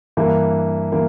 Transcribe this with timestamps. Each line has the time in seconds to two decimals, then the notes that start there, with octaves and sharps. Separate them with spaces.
0.17 G2 E3 A#3
0.92 E3 A#3